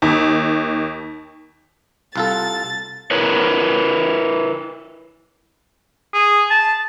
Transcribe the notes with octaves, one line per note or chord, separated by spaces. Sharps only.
D#2
C2 F4 A4 A6
E4 A#4 B4 C#5
G#4
A5